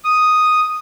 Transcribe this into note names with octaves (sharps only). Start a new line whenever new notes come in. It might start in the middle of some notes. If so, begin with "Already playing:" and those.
D#6